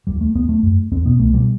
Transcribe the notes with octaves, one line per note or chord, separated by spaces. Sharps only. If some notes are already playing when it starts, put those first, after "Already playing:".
D#2 G3
A3
D#2 B3
A3
F#2
E2 C4
B2 B3
C2 A3
B2 G3